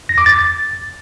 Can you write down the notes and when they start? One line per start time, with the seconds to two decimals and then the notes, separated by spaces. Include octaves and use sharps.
0.09 A#6
0.18 D6
0.26 A6